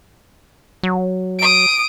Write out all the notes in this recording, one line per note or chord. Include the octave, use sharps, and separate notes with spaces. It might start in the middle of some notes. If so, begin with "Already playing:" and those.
F#3
D#6 D7